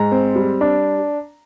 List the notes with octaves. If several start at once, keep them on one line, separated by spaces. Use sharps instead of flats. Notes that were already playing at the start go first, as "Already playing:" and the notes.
Already playing: G#2 A#5
C4
G3
D4